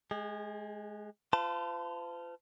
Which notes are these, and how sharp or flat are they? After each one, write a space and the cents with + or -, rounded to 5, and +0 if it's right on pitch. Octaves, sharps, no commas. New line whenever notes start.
G#3 +20 G#4 -35
F4 -20 C5 -45 A5 +0